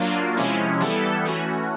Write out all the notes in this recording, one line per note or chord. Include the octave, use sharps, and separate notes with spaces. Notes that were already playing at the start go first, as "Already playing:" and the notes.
Already playing: F#3 A#3 D4 F4
C3 F3 G#3 C#4 E4
E3 G3 B3 E4 A4
E3 A3 C#4 F#4